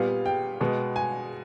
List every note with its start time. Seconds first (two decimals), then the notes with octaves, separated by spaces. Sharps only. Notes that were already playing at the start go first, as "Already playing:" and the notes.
Already playing: A#2 G3 B3 F5
0.26 G5
0.61 B2 G#3 B3
0.96 G#5